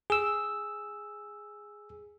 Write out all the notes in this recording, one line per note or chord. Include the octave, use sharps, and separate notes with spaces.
G#4 E6